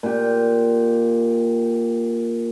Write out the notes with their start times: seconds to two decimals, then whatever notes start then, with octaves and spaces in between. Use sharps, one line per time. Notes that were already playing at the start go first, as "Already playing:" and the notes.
0.03 A#2 G4